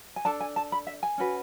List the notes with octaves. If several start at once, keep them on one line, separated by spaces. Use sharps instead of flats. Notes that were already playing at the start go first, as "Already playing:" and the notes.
G#5
D4 A4 A5
G#5
A5
B5
E5
G#5
C#4 F#4 B4